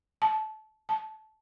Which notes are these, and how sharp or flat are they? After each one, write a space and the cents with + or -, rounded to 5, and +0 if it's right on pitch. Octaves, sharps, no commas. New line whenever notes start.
A5 -20
A5 -15